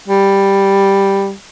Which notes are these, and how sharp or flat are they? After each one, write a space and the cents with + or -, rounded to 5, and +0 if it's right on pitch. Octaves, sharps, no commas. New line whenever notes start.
G3 +5